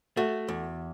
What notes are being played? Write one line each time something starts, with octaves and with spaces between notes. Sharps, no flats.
A3 F#4
E2